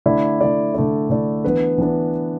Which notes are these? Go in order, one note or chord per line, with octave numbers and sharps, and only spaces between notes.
D3 A3 E4 D5
D3 A3 E4 D5
D3 A3 E4 D5
D3 A3 E4 D5
E3 B3 D4 B4
E3 B3 D4 B4